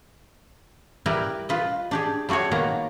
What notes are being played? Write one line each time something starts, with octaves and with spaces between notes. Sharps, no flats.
G3 E4 A#4 B4
F4 B4 D#5
D4 G4 G#4
G3 A3 F#4 G#4 C#5
D#3 A#3 B3 A#5